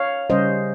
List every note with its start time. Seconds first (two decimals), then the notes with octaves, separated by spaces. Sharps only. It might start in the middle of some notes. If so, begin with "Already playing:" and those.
Already playing: C#5 F5
0.30 C#3 G3 C#4 C5 D#5